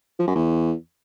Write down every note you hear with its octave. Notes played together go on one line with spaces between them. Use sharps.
F3
F#2
E2